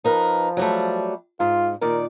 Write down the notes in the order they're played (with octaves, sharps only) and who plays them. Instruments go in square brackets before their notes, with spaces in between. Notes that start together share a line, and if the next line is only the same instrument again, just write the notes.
[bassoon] F3 [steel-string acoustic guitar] D#4 A#4 B4
[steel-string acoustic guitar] F#3 G3 A3
[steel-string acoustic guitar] G#2 [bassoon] F4
[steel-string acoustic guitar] A#2 D#3 D5 [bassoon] A#4